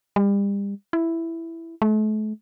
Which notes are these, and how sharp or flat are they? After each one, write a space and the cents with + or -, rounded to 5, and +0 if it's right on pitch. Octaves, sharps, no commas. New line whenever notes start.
G3 +35
E4 +5
A3 -40